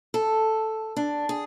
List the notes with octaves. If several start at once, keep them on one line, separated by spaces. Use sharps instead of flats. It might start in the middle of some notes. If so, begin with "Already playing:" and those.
A4
D4
G#4